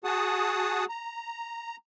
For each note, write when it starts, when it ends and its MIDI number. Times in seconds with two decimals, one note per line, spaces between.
0.04 0.85 66
0.04 0.85 68
0.04 0.85 78
0.04 0.85 81
0.04 0.85 87
0.89 1.76 82